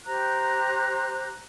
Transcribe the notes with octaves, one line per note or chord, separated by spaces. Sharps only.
G4 C5 A#5 F#6